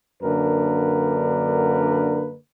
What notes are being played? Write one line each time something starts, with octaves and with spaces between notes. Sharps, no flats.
F#2 D3 A#3 D4 A#4 B4